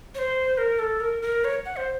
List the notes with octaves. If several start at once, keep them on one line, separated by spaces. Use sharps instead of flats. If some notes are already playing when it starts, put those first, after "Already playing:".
C#5
C5
A#4
A4
A#4
A#4
C#5
F#5
C5